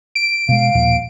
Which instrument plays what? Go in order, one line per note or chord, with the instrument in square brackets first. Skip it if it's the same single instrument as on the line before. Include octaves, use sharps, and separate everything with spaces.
[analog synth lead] D7
[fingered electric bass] B2 G#3 [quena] F5
[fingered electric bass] D#2 A#2 F3